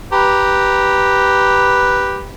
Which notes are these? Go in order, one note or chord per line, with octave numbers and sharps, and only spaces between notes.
G4 B4 A#5